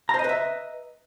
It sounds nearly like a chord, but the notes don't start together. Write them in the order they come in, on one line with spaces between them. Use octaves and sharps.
A#5 C5 D#5 B4 E5